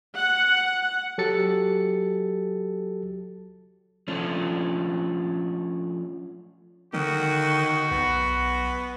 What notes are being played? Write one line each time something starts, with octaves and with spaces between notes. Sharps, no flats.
F#5
F#3 G4 A4 A6 C#7
F3 A3 C#4 D4
D3 D#3 F#4
B1 B3